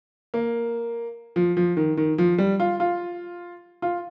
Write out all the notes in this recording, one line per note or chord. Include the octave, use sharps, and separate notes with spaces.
A#3
F3
F3
D#3
D#3
F3
G3
F4
F4
F4